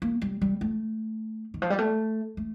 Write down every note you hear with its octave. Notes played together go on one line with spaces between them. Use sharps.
A#3
G3
G3
A3
D#3
F3
G3
A3
A3